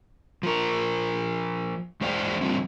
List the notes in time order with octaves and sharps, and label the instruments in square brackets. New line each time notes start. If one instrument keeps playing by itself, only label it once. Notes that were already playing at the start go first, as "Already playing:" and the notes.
[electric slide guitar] F3 A#4
E2 G#3 C5 D5 F5 G5
D3 F3 G3 C4